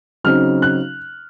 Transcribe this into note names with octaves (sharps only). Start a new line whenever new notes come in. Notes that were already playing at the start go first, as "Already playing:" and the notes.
C#3 F#3 C4 D#4 F6
F#6